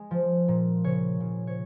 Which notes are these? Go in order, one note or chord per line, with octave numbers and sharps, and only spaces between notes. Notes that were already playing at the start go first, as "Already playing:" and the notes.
Already playing: G#3
F3
A#2
C#3 C#5
C#3
C#5